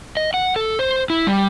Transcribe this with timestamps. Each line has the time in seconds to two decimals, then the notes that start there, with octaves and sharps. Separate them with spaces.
0.17 D#5
0.34 F#5
0.56 A4
0.79 C5
1.10 E4
1.27 G3